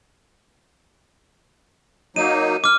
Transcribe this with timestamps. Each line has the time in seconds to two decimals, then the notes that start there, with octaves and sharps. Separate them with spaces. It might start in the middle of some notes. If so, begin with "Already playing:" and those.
2.16 F#3 A#3 D#4 D#7
2.64 D6 F6